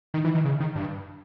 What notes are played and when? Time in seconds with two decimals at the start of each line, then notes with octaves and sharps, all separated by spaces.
0.14 D#3
0.25 E3
0.35 D#3
0.45 C#3
0.60 D#3
0.76 G2